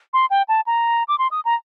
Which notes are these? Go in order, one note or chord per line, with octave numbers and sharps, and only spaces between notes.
C6
G5
A5
A#5
D6
C6
D#6
A#5